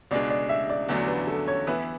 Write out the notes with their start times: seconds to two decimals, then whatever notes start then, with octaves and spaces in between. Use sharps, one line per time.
0.11 C#2 B2 G#3 D4 D5
0.30 D5
0.49 E5
0.69 D5
0.89 E2 D3 F#3 A3 D4 D5
1.08 B4
1.27 A4
1.47 C#5
1.67 E3 B3 E4 B4